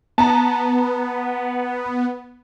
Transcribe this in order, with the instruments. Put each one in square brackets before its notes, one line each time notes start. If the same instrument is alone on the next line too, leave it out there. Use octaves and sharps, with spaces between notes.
[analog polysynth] B3 [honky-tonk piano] A5 A#5